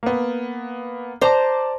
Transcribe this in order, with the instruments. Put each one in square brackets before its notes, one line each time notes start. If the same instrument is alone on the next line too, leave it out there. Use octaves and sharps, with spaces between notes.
[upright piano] A#3 B3
[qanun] C5 A#5 [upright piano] D5 A5 D6